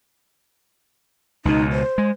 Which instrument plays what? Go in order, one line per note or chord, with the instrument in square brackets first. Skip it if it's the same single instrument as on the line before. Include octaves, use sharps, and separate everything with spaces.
[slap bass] C#2 B2 [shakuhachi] D#4
[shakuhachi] C5
[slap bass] G#3